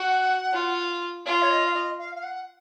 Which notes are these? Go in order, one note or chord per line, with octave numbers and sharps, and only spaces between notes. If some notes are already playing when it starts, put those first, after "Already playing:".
Already playing: F#4 F#5
F4
F4 F5
C#5
D#5
F5
D#5
F5
F5
F#5